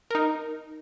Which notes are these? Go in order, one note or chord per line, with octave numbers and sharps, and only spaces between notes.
D#4 A#4